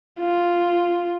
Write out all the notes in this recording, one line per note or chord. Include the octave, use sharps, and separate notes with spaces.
F4